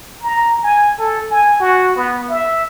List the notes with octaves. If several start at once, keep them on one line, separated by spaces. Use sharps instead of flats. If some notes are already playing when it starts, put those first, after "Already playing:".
A#5
G#5
A4
G#5
F#4
B3
E5